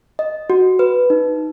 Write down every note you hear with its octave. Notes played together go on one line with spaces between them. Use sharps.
D#5
F#4
B4
D#4